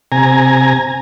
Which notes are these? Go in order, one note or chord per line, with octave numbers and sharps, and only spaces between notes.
C3 G#5 A#5